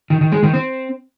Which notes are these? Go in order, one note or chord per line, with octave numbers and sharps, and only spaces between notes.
D#3
D#3
G#3
D#3
C4